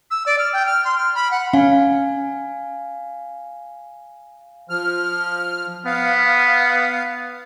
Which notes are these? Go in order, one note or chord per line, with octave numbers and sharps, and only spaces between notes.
E6
D5
F6
G5
F6
C6
F6
B5
F#5
C#4 F5 G#5
F3 F6
B3 F5